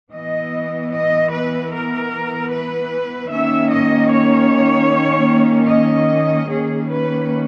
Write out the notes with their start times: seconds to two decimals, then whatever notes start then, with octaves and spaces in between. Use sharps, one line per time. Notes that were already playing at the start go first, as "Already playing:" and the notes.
0.13 E3 B3 D#5
0.93 D#5
1.33 B4
1.72 A#4
2.51 B4
3.31 D#3 A#3 C#4 E5
3.71 D#5
4.11 C#5
5.70 D#5
6.50 D#3 A#3 C#4 G#4
6.90 B4